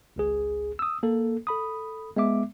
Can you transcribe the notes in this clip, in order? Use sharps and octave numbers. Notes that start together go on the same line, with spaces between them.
G#1 C#2 G#4
D#6 E6
A#3 A4
A4 B5 D#6
G#3 B3 E5 D6